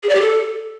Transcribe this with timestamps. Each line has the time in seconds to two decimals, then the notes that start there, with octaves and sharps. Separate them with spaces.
0.03 G#4
0.09 D5
0.15 G4
0.21 A4